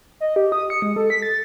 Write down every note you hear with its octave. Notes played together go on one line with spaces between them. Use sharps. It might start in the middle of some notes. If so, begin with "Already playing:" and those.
D#5
G4
D#6
C#7
G#3
A4
B6
A6